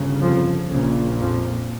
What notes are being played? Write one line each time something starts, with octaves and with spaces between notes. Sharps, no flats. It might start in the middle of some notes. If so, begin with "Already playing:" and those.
Already playing: G1 C#3
F2 F3
A#1 A#2 C#3
F2 F3